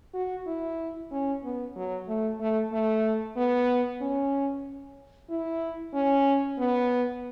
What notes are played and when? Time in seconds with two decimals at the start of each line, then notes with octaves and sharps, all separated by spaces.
0.14 F#4
0.47 E4
1.12 C#4
1.44 B3
1.76 F#3
2.08 A3
2.40 A3
2.72 A3
3.37 B3
4.01 C#4
5.30 E4
5.94 C#4
6.58 B3